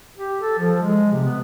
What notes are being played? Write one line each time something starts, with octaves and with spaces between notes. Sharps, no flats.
G4
A4
F3
G#3
C3
B3